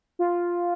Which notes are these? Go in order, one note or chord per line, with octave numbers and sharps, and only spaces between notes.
F4